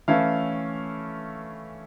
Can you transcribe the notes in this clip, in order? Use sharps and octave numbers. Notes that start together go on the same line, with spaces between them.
E3 A3 C#4 E4 F5